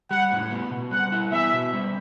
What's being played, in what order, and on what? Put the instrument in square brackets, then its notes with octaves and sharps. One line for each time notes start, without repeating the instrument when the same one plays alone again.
[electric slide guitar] G3 [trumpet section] F#5
[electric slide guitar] A2
B3
B2
[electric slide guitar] G3 [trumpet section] F#5
[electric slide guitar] E4
[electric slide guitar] B3 [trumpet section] E5
[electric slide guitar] B2
G3